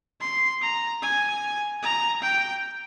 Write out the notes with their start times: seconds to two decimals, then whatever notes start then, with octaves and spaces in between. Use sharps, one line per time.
0.20 C6
0.61 A#5
1.02 G#5
1.82 A#5
2.22 G5